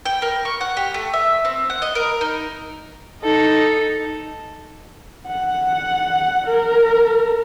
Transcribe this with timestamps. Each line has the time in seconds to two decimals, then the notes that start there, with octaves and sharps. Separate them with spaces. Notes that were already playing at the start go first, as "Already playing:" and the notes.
0.05 G5
0.22 A#4
0.45 C#6
0.61 F#5
0.77 G4
0.94 A3
1.14 E5
1.45 C4
1.70 F#5
1.82 D#5
1.95 A#4
2.21 D#4
3.22 D#4 A4
5.27 F#5
6.47 A#4